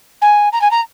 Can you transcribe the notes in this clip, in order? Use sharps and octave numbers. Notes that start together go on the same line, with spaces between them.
G#5
A#5
G#5
A#5